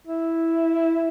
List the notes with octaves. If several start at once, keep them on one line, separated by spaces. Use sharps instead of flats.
E4